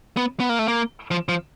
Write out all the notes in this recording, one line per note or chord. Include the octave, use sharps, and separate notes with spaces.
B3
B3
A#3
A3
A#3
F3
F3